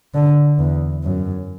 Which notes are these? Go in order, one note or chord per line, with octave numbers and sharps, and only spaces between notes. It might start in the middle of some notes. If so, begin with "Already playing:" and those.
D3
E2
F#2